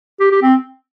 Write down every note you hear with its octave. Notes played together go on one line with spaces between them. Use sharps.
G4
G4
C4